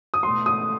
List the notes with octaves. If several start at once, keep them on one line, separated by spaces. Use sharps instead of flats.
D#6
E2 B2 A3 C6
D#6